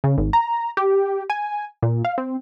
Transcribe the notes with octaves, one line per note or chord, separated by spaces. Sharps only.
C#3
G#1
A#5
G4
G#5
A#2
F5
C4